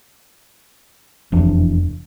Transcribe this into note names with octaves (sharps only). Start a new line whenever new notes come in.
F1 E2 D4